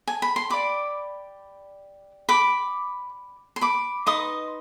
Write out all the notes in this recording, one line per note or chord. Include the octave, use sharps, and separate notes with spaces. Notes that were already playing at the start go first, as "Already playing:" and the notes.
G#5
B5
C6
G4 D5 B5 D6
B5 D6
C6
B5 D6
D#4 B4 D#5 C6 D#6